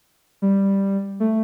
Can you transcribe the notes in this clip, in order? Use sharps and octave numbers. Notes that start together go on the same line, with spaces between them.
G3
A3